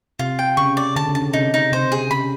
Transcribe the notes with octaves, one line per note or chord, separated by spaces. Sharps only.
C3 F4
G5
C#3 C#6
D5
D3 A5
C#3
A5
C#3
C3 D#4
D#4
C3 C5
G#4
C#3 B5